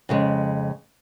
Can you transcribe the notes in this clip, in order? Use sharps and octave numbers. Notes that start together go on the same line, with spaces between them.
F2 C#3 G#3